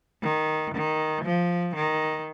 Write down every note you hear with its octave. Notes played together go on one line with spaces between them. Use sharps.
D#3
D#3
F3
D#3